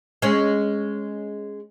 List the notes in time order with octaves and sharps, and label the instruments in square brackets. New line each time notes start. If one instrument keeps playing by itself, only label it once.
[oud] G#3 C#4